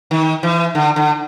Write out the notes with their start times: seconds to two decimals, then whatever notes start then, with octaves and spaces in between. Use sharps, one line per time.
0.11 D#3
0.43 E3
0.75 D3
0.96 D3